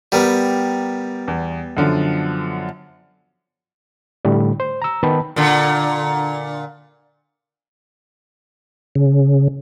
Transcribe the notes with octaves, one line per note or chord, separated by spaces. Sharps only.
G3 B3 G4 A#4
E2
F#2 D3 F3
A2 D3 G3
C5
A#5 E6
D#3 B3 B4 G5 A5 B5
A#2 D3
C#3